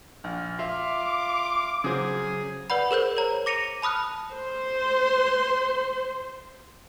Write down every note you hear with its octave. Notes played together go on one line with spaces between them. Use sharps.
A#1 F6
F4 E5 D6
C#3 F#3 G#4 C5
B4 D5 F#5 B5
G#4 A#4 C5 G6
A#4 C#5 A#5
D6 A#6 C#7 D#7 F7
A5 B5 D#6 F6 F#6
C5 C6